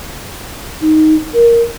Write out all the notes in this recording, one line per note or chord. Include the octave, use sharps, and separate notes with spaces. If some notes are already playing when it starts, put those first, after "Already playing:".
D#4
A#4